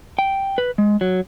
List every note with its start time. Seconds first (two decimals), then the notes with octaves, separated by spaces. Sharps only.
0.19 G5
0.58 B4
0.78 G#3
1.01 F#3